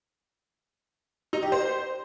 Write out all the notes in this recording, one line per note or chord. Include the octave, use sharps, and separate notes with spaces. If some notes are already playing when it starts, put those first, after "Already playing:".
D#4
G4
C5